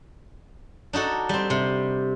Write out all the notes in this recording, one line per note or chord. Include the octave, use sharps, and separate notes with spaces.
D4 D#4 F#4 A4
G3 C4
C3